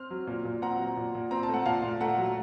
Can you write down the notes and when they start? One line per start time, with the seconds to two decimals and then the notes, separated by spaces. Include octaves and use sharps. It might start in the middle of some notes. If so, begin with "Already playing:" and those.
Already playing: C4 F6
0.11 F#3
0.27 A#2
0.45 A#2
0.62 C4 F#5 A#5
0.79 F#3
0.97 A#2
1.15 A#2
1.31 C4 A#5
1.43 A5
1.49 A3 F#5
1.65 A#2 F5 A5
1.83 A#2
2.01 A3 F#5 A#5
2.18 F#3